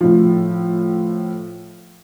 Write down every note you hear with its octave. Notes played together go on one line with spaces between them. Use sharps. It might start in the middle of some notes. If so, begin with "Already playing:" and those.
A2 F3